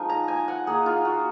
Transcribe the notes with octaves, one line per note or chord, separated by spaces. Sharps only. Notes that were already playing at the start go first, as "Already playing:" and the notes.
Already playing: F3 G#3 D#4 G#5
A#5
G#5
F#5
A#3 D#4 G#4
F4
F#4